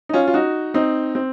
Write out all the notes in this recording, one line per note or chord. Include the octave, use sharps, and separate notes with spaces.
D#4
C#4 F4
F4
D#4 F#4
C4 D#4
C4